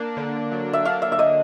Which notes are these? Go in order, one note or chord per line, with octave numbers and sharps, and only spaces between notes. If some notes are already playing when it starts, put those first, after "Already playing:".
Already playing: A#3 D4
D3
F#3
E5
D4 F5
E5
E5
A#3 D#5